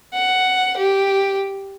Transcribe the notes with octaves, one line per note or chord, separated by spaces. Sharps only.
F#5
G4